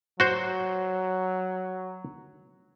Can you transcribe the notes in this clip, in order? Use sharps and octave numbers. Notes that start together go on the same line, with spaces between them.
F#3 F#4 C5